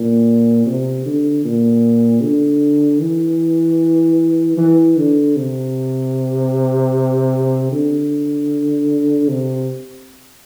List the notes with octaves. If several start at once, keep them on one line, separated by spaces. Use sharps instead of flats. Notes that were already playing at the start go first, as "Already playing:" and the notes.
Already playing: A#2
C3
D3
A#2
D3
E3
E3
D3
C3
D3
C3